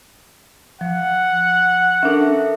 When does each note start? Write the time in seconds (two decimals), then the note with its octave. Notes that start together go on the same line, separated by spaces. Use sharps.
0.81 F3 F#5
2.03 C#4 D4 A4 A#4 E5